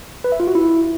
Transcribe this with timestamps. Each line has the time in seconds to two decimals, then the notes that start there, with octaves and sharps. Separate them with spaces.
0.24 B4
0.32 E5
0.40 F4
0.47 F#4
0.55 E4